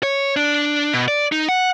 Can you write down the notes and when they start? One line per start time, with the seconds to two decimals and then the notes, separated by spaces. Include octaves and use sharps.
0.03 C#5
0.36 D4
0.93 B2
1.08 D5
1.32 D#4
1.49 F#5